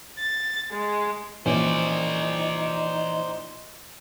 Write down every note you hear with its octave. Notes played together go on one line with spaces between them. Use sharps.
A6
G#3
A#1 E3 C#4 D#4 C5 D5 G#5